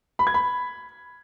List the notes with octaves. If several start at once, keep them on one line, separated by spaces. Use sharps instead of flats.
B5
G#6
B5